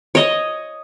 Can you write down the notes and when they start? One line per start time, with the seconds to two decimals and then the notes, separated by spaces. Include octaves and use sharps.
0.15 C#5 D#5